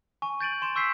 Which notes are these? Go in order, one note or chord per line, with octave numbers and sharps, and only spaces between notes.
G#5 C#6
G6 A6 D7 D#7 F#7
C6 E7
C#6 E6 G6 B6 C7